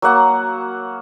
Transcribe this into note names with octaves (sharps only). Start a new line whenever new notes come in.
F#3 A#3 F#5